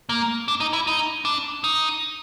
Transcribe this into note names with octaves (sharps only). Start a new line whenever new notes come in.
A#3
D4
D#4
E4
D#4
D4
D#4